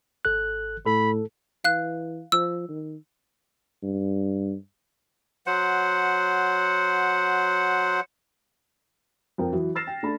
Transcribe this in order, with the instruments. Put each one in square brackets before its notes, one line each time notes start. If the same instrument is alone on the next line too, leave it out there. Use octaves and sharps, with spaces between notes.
[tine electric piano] G#1 A4 F#6
[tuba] A2 [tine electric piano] A4 [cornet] B5
[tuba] E3 [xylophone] F5 F#6
[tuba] F3 [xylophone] E6
[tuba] D#3
G2
[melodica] F#3 C5 F#5
[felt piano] F2 A#4 G5
E3 F#3
E6 F6 A6 A#6 C7 E7
G5
A3 D4 B5